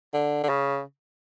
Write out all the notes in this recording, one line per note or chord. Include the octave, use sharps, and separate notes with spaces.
D3
D3
C#3